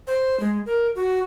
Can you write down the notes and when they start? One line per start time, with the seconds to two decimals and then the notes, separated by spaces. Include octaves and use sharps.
0.07 C5
0.40 G#3
0.66 A#4
0.95 F#4